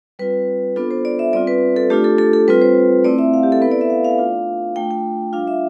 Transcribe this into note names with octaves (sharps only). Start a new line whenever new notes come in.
G3 C4 F4 B4
B3 D4 F4 A4
C5
D5
E5
G3 C4 F4 D5
B4
A4
A3 D4 F4 G4
A4
A4
A4
G3 C4 F4 B4
C5
A3 C4 E4 D5
E5
F5
G4
A4
B3 E4 B4
D5
E5
F5
F5
A3 D4 F4
A3 D4 F4 G5
G5
G3 D4 F4 F5
E5